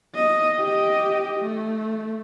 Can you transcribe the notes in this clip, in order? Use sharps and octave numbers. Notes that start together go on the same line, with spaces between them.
D#5
G4 D#5
A3